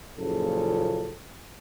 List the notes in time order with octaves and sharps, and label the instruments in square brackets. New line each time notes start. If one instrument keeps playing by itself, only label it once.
[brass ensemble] F#1 A#2 C#3 F3 A4